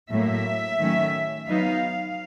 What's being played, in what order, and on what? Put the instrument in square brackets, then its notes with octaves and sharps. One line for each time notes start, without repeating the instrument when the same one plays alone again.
[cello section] A2 F#3 A#3 E5
D#3 F#3 A3 C#4
F#3 B3 D#4 F5